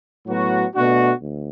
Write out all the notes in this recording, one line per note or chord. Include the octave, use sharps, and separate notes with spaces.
A2 F#3 B3 F#4
B2 A3 D4 F#4
D2